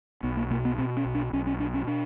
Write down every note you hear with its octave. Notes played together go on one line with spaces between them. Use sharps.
B1 B3
A#3
B2 A#3
B3
B2 C4
C#4
B1
D4
B1 C#4
C#4
B2 D4
C#4
B2 D4